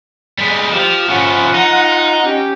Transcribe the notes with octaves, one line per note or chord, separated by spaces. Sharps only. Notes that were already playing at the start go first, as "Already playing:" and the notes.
G3 G#3
F3 G4
F3 C#4 F4 F#5
D#4
C#4 G4